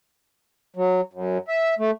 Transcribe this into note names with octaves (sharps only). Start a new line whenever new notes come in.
F#3
F#2
E5
A3